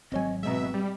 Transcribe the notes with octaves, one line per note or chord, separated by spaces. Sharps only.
G#1 F#3 C4 C#5 D#5 G#5
B2 G#3 C4 D#5 E5 A#5
G3